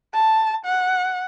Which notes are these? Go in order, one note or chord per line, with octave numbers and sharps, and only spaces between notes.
A5
F#5